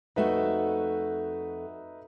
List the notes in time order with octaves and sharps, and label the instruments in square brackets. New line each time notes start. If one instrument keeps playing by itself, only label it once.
[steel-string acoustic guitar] F2 A3 F#4 [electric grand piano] D#4 B4 E5